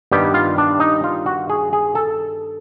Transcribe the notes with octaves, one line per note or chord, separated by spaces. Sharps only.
G2 D#3 G3 B3 G4
F4
D4
D#4
F4
F#4
G#4
G#4
A4